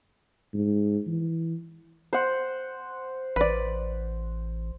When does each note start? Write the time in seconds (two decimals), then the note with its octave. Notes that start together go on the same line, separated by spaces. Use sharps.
0.54 G#2
1.07 E3
2.13 C5 F#5
3.36 A1 B4 D5